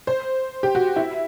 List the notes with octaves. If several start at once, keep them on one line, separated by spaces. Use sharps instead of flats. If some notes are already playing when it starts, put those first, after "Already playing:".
C5
G4
F#4
E4